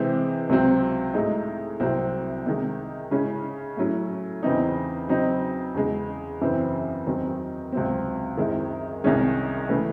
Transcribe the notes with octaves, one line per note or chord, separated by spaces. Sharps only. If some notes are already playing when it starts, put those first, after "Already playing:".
Already playing: C3 E3 G#3 C4
C#2 C3 F#3 C4
A2 G#3 D#4
C2 C3 F#3 C4
C3 D#3 G#3
C#3 G#3 C#4 E4
A2 F#3 C#4 E4
E2 C#3 E3 C4 D#4
C#3 F#3 C4 D#4
E2 C#3 G#3
F#2 C#3 E3 C4
E2 D#3 F#3 C4
C#2 C3 F#3 C4
F#2 D#3 G#3 C4 E4
C2 C3 D#3 G#3 C#4
C#3 E3 A3